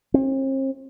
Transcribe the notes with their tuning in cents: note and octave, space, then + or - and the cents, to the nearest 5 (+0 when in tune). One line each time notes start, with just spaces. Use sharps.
C4 +40